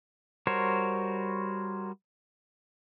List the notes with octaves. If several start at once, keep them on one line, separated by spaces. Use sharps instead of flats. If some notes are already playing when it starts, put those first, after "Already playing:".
G3 F#4 A#4 C5 C#5